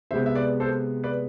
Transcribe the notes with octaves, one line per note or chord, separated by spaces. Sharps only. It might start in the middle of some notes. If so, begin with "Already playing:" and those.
C3 G#3 B3 C5 E5
E5
B4 D5
A4 C5
B4 D5